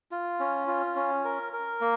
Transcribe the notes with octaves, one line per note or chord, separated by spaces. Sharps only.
F4
C#4
F4
C#4
A#4
A#4
A#3